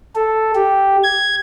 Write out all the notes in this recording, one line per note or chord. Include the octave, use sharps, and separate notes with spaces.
A4
G4
G#6